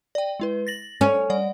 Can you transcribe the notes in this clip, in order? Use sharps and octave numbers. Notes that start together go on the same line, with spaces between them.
D5 G5
G#3 E4 B4
A6 A#6 F#7
C#4 A4
G3 D5 F#5